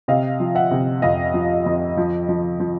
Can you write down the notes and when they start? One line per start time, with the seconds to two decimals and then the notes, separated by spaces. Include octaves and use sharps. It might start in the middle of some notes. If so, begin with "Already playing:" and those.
0.08 C3 D#5 F5
0.40 F3
0.55 E5 F#5
0.71 C3
1.02 F2 D#5 F5
1.34 F3
1.66 F2
1.97 F3
2.29 F3
2.60 F3